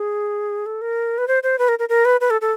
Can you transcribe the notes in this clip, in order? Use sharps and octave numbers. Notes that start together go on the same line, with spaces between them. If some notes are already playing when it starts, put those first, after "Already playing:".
Already playing: G#4
A4
A#4
B4
C5
C5
B4
A#4
A#4
A#4
B4
B4
A4
A4